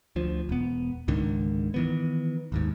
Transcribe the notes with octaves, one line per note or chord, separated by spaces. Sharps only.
D2 F3
E1 B3
C#2 G#2 D3 D#3
D#3 E3 B3
G#1 D#2 G#2